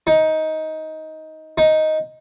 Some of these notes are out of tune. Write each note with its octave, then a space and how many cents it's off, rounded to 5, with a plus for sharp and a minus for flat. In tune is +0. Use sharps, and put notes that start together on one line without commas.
D#4 +15
D#4 +5